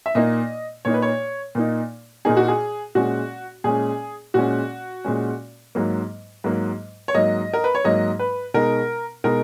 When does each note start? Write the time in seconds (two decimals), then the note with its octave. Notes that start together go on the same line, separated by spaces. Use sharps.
0.06 E5
0.15 A#2 A#3 D#4 D#5
0.85 A#2 A#3 D#4 C#5
0.94 B4
1.02 C#5
1.55 A#2 A#3 D#4
2.25 A#2 A#3 D#4 G#4
2.37 F#4
2.48 G#4
2.95 A#2 G#3 C#4 F#4
3.64 A#2 G#3 C#4 G#4
4.34 A#2 G#3 C#4 F#4
5.05 A#2 G#3 C#4
5.75 G#2 F#3 A#3
6.44 G#2 F#3 A#3
7.08 C#5
7.14 G#2 F#3 A#3 D#5
7.54 A#4
7.64 B4
7.75 C#5
7.84 G#2 F#3 A#3 D#5
8.19 B4
8.54 B2 G#3 D#4 A#4
9.24 B2 G#3 D#4 A#4